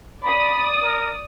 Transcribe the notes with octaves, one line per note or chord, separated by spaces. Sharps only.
D5 B5 D#6
A#4